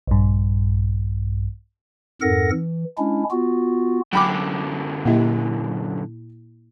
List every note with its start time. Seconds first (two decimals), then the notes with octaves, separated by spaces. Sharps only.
0.07 A#1 G2
2.22 F2 G#2 A4 A#4 F#5 A#6
2.51 E3
2.98 G#3 C#4 D4 E4
3.30 B3 F4 F#4
4.13 F#2 D3 G5 B5 D6
5.05 A#2 A#3 E4 G4 D#5